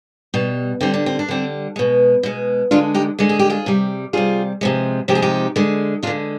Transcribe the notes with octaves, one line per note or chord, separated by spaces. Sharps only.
B2 G3
D3 G3 C4
D4
C4
D4
D3 G3 C4
B2 G#3
B2 G#3
D3 G#3 D4 F4
D#4 G4
D3 G#3
G#4
G4
F4 G#4
C3 G3
C3 G3 F4 G#4
C3 F3 G#3
C3 F3 G#3 G4
G#4
D#4 G4
D3 G#3
D3 G#3 D4 F4